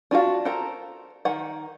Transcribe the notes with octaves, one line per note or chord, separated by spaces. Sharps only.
D4 F4 F#4 F5
A4 A#4 C5 A#5
D#3 F#5